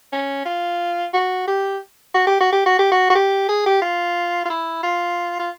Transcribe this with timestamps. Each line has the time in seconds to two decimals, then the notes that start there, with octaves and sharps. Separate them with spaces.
0.13 C#4
0.46 F4
1.13 F#4
1.47 G4
2.14 F#4
2.27 G4
2.40 F#4
2.53 G4
2.66 F#4
2.79 G4
2.92 F#4
3.10 F#4
3.15 G4
3.49 G#4
3.66 G4
3.82 F4
4.46 F4
4.50 E4
4.83 F4
5.39 F4